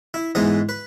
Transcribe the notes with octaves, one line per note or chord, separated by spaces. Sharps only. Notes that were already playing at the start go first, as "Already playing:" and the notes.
E4
G#2 E3 G#3 B3 D#5
B4